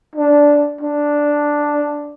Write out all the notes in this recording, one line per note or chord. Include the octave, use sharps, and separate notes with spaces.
D4
D4